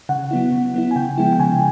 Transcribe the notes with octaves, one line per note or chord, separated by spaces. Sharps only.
C#3 F#5
F#3 B3 E4
C#3
F#3 B3 E4
G#5
C#3 G5
F3 G#3 B3 E4
G5
C#3 G#5